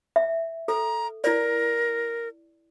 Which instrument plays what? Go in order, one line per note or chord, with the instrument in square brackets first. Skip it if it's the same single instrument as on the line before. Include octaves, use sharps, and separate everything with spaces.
[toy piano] E5
[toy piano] A4 [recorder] A#5
[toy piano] E4 D5 [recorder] A#4